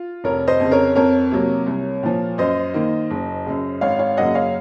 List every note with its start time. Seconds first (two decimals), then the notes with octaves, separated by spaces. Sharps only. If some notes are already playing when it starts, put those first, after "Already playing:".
Already playing: F4
0.24 F1 A#4 C#5
0.47 C5 D#5
0.60 F2 C#3
0.71 A#4 C#5
0.95 F2 A#4 C#5
1.32 C3 F#3 A#3
1.67 C2
2.03 A#2 F3
2.38 F#2 C5 D#5
2.74 D#3 A#3
3.11 F#1
3.46 F#2 C#3
3.81 G#1 C#5 F5
3.99 C#5 F5
4.17 F#2 C#3 F#3 A#3 D#5 F#5
4.35 C#5 F5